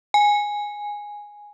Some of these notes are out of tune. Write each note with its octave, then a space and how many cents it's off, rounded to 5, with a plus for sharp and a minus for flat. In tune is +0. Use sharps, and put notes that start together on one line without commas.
G#5 -5